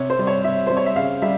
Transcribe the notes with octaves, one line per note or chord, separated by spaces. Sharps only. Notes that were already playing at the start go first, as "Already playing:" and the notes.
Already playing: C3 C#5
C5
G3 C4
C#5
C3 E5
G3 C4 C5
C#5
E5
C#3 F5
G3 E5